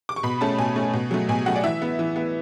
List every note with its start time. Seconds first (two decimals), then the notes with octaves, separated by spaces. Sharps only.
0.09 D6
0.16 C#6
0.23 B2 B5
0.41 A3 C#4 A5
0.58 B2 G#5
0.76 A3 C#4
0.93 B2
1.11 F#3 A3
1.29 B2 G#5
1.46 F#3 A3 F#5
1.56 D5
1.64 E3 E5
1.82 B3
1.99 E3
2.16 B3